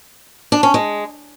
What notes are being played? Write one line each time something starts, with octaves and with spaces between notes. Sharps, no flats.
D4
C#4
G#3